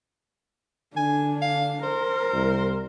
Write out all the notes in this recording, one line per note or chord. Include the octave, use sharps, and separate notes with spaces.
D3 D4 G#5
F5
A#4 C5
C2